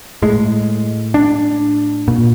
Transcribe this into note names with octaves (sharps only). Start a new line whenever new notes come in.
A2 G#3
D4
A#2